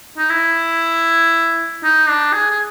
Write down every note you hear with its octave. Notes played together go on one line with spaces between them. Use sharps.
D#4
E4
D#4
D4
G#4
G#4